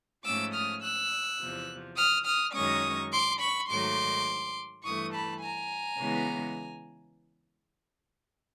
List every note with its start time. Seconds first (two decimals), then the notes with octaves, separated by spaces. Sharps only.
0.25 G#2 F3 A3 C#4 D6 E6
0.53 D#6 F6
0.82 E6 F#6
1.39 E2 C3 F3
1.97 D#6 F6
2.25 D#6 F6
2.54 F#2 D#3 G#3 C#4 C#6 D#6
3.12 C6 D6
3.40 B5 C#6
3.69 G#2 D#3 F#3 A3 C6 D6
4.84 G2 E3 A3 C#6 D#6
5.13 A5 B5
5.42 G#5 A#5
5.99 C#3 E3 G#3 B3